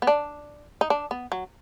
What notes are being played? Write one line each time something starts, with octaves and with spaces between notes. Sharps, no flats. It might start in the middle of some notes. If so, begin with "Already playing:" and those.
B3
D4
D#4
D4
B3
F#3